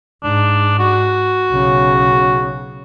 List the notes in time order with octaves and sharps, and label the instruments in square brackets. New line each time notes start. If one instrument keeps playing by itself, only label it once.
[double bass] G#2 [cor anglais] D4
[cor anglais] F#4
[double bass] B1 C#3